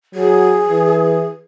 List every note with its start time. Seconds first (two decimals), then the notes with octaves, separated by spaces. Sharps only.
0.15 F#3 G#4
0.68 E3